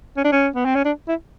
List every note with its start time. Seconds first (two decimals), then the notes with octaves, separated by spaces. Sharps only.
0.17 C#4
0.24 D4
0.32 C#4
0.55 B3
0.65 C4
0.75 C#4
0.85 D4
1.08 E4